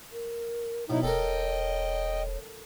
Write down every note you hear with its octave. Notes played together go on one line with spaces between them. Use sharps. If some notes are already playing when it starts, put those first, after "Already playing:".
A#4
B2 F#3 D#4 E4 C#5
E1 A4 A#4 D#5 G5